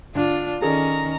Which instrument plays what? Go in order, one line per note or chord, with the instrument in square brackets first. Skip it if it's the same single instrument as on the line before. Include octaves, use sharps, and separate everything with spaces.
[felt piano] D3 [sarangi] D4 [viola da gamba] F4
[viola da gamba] D#3 C#4 [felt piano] G#4 A4 D5 [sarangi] A#5